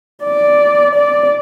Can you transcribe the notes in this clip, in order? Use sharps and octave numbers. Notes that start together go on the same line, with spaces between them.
D5
D5